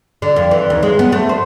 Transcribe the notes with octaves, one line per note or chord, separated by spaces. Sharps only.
D3
F2
E3
D#2
G#3
B3
A3
C5